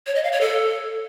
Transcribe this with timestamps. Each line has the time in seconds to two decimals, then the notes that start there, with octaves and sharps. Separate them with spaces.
0.07 C#5
0.15 D#5
0.24 F5
0.32 C#5
0.41 A4